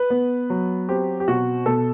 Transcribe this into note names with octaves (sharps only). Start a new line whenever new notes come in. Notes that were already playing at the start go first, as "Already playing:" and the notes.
Already playing: B4
B3
F#3
C4 G4
G4
B2 F#4
B2 A4